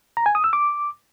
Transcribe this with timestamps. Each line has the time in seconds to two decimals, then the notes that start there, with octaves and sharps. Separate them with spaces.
0.17 A#5
0.26 G#5
0.35 D#6
0.44 E6
0.53 D6